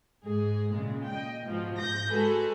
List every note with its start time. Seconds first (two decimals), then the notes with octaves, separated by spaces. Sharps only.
0.23 G#2 G#4
0.72 A#2 C#3 G#3
1.10 D#5 G5
1.43 G#2 B2 F3
1.79 G#2 G6 A#6
2.11 G#3 F#4 G#4 A4 B4